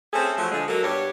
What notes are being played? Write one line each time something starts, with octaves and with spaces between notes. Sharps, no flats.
A3 C4 C#4 E4 G#4 A4
F3 F#3 A3
D3 F3 G#3
F#3 A#3 A4
G2 B3 D4 G4 C#5